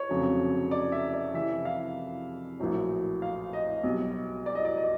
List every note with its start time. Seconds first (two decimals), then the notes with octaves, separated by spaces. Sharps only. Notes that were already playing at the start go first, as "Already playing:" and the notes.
Already playing: C#5
0.09 F1 F2 C#3 F#3
0.71 D5
0.92 E5
1.14 D5
1.34 F2 C3 E3 E5
1.65 F5
2.59 A#1 A2 F#3
3.22 F5
3.53 D#5
3.83 B1 B2 G3
4.46 D5
4.55 D#5
4.65 D5
4.77 D#5